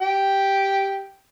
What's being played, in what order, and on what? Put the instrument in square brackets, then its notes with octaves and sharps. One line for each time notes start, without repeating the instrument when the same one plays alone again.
[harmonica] G4 G5